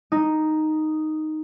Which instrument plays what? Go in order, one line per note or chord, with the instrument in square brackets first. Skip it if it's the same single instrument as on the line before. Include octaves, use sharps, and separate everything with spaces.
[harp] D#4